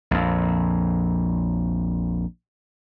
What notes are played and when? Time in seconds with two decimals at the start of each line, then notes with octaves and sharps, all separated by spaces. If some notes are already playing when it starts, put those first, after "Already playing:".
0.11 A#1 F2